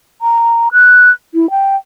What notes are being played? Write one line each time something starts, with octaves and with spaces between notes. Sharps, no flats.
A#5
F#6
E4
G5